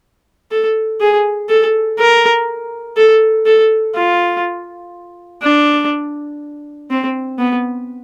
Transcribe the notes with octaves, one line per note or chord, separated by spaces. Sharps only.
A4
G#4
A4
A#4
A4
A4
F4
D4
C4
B3